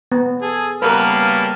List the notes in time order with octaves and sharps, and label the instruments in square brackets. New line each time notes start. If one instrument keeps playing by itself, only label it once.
[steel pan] B3
[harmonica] G#4 A4
[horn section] C#3 A#3 B3 [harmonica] G3 A5 F6 [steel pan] A#4 B4